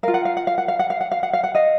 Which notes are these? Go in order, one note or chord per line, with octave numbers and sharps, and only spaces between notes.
F4 A#4 F5
F#5
F5
F#5
F5
F#5
F5
F#5
F5
F#5
F5
F#5
F5
F#5
D#5 F5